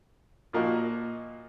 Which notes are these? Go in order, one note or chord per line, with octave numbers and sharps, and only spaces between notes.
A#2 F3 A#3 D#4 F#4